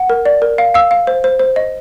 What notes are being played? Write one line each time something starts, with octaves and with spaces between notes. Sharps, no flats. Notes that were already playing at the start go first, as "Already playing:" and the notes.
Already playing: F#5
A#4
D5
A#4
F5
F5 E6
F5
C5
C5
C5
D#5